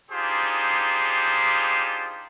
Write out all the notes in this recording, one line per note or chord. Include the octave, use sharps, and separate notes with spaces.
D4 D#4 F4 G4 G#4 C5